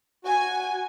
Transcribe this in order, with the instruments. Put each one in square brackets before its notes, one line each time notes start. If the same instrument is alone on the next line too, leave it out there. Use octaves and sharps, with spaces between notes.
[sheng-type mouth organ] F#4 [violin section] G#5